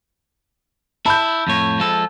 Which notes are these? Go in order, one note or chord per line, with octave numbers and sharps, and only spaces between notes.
E4 A5 B5 G6
F2 A2 C#5
F3 G#3 A4